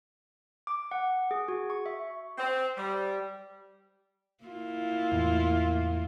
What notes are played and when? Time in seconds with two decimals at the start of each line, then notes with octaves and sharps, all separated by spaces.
0.67 D6
0.91 F#5
1.31 G#4
1.48 F#4
1.70 C#6
1.86 E5
2.38 C4
2.77 G3
4.44 A#3 E4 F4
5.12 E2 A2